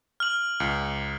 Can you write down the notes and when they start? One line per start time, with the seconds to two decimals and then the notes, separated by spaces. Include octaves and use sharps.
0.20 F6 F#7
0.60 C#2